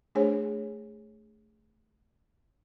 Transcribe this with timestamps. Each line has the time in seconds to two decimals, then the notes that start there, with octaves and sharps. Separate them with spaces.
0.15 A3 D4 G#4 C5 C#5 G#5